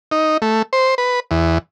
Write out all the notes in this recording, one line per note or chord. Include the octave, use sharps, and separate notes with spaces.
D#4
A3
C5
B4
E2